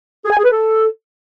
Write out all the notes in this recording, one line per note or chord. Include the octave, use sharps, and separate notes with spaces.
G#4
G#5
G#4
B4
A4